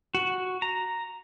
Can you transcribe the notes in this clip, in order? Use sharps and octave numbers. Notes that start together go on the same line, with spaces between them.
F#4
A#5